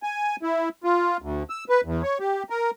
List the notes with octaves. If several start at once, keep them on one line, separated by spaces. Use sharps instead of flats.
G#5
E4
F4
D2
E6
B4
E2
C#5
G4
A#4